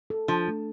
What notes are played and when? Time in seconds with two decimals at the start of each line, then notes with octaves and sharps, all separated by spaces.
0.10 A4
0.28 F3 D4
0.48 A3